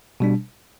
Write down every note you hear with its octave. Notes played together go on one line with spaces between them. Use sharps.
B2 G3 D4